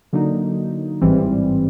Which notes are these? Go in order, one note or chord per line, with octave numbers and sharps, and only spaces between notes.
D3 F#3 A#3 D#4
A1 G#2 E3 G3 C4